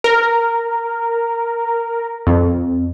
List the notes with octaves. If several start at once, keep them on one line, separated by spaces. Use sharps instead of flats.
A#4
F2